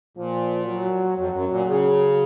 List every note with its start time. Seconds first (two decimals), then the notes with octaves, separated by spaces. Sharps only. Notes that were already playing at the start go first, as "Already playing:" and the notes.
0.17 A#2 F3
0.66 F#3
1.17 F2 F#3
1.33 F#2
1.50 A#2
1.67 C#3